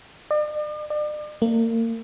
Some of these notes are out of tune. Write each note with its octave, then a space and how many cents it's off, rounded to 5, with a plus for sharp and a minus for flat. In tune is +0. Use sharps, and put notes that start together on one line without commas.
D5 +45
D5 +40
A#3 -35